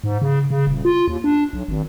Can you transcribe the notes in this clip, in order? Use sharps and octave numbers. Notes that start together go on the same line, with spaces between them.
G#2
C#3
C#3
D#1
F4
D#2
D4
B1
G#1